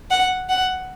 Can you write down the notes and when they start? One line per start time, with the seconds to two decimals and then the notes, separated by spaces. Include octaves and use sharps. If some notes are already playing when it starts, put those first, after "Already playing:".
0.11 F#5
0.49 F#5